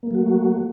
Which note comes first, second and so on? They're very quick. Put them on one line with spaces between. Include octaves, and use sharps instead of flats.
A#3 A3 F#3 F#4